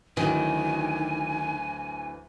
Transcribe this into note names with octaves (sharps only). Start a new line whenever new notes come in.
D2 D#3 E3 F#3 G#5